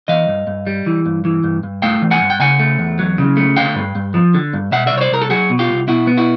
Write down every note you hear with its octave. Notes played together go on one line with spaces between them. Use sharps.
E3 D#5 F5
G2
G2
G3
E3
G2
E3
G2
G2
A3 F5 G5
E3
F#5 G#5
G2
G5
C#3 F#5 G#5
A3
E2
F#3
C#3
A3
D3 F5 G5
G2
G2
F3
D3
G2
B2 E5 F#5
D5 E5
C2
C#5
C5 D5
C2 A#4
A4
F#3 F#4 G#4
B2
F4 G4
C2
B2 E4 F#4
B3
E4 F#4